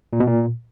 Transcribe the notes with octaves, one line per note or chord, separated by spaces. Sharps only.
A#2
B2
A#2